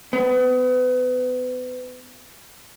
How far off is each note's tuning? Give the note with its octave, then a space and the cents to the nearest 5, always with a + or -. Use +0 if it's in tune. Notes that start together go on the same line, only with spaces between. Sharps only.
B3 +35